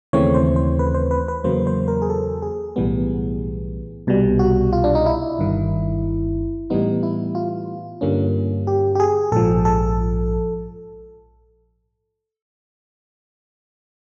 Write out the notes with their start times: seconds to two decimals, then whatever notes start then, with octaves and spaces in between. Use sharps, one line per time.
0.13 D#2 C#3 E3 A3 C4 C#5
0.34 C5
0.56 C5
0.79 B4
0.94 C5
1.11 B4
1.28 B4
1.44 E2 C#3 F#3 A#3 C5
1.67 C5
1.88 A#4
2.02 G#4
2.10 A4
2.42 G#4
2.76 B1 A2 E3 G3 B3
4.07 C2 B2 G3
4.39 F#4
4.73 F4
4.84 D4
4.95 D#4
5.06 E4
5.39 G1 G2 D#3
6.70 A2 E3 G3 B3 D#4
7.03 E4
7.35 F4
8.01 G2 D3 G3 A#3 C#4
8.67 G4
8.95 G4
9.00 G#4
9.32 A#1 G#2 F3 A4
9.65 A4